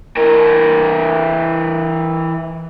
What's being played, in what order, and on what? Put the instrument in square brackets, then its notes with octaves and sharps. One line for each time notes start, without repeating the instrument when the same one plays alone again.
[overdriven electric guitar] E3 A#4